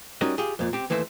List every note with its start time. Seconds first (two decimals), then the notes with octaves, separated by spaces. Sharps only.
0.21 G3 C#4 D#4 F#4 A#4 D#5
0.38 F4 G4 G#4
0.59 F2 A#2
0.73 C4 G4
0.90 D#2 E3 A3 C5 D5 E5